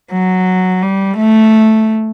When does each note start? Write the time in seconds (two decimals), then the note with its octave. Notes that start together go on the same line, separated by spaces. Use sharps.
0.12 F#3
0.82 G3
1.17 A3